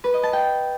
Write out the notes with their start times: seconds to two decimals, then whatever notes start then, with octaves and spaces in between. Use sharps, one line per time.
0.04 B4
0.14 D#5
0.23 A5
0.33 G5